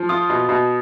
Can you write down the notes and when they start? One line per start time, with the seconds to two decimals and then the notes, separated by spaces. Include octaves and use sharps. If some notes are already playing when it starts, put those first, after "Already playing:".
Already playing: F3
0.09 F4 D#6
0.30 B2
0.49 B2